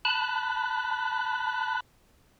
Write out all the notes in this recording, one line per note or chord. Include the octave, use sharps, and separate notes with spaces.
A5 B5 F#6